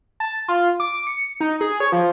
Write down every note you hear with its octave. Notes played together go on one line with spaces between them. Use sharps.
A5
F4
D6
C#7
D#4
G#4
C#5
F3